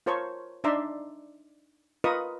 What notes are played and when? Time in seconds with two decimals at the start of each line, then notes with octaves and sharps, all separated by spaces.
0.06 F4 A#4 C5 C#5 A5 C#6
0.64 D4 D#4 D5 E5 A#5 C6
2.04 F4 A#4 B4 D#5 C#6 D#6